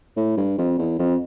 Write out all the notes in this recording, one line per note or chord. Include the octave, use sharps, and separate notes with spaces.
A2
G2
F2
E2
F2